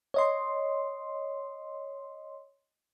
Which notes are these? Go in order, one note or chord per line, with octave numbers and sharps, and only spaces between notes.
C#5 D#5 C6